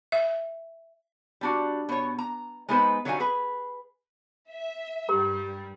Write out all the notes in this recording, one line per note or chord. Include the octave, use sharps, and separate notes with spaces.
E5
G3 D4 F#4
B2 C#5
A#5
G#3 B3 D#4 A4 B4 C5
D3 F#3 G3 D#4 F5 G#5
G#4 B4
E5
G2 G3 G4 A#4 A#5